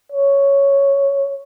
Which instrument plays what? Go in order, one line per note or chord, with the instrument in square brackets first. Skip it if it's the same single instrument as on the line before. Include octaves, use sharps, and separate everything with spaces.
[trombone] C#5